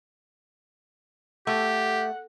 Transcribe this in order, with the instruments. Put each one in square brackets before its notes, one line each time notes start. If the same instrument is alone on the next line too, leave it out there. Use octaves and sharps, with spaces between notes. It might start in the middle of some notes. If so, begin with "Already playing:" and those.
[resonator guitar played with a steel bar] A3 [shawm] G4 [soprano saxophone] F#5